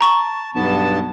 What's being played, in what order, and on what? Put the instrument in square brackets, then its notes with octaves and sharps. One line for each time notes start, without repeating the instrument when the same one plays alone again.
[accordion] A5 [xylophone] A#5 C#6
[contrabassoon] B1 [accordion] G2 B3 A5